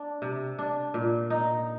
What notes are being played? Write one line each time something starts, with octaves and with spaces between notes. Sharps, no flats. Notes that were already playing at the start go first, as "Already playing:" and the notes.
Already playing: D4
C3
D4
A#2
D#4